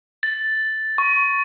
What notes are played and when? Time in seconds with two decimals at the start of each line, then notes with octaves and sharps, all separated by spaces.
0.23 A6
0.98 C#6